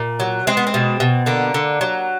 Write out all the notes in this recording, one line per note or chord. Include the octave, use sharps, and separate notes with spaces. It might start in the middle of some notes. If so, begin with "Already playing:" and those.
Already playing: A#2
F#3
G#3 C4
B3
C4
B2
B2
D3 A#3
D3
F#3